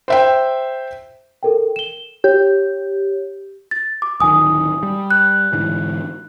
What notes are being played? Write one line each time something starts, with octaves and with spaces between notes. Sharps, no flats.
C5 E5 G5
A4 A#4 G5
E7 G7
G4 C#5
A6
D6
D1 D#3 G#5 D#6
G3
F#6
G#2 D3 E3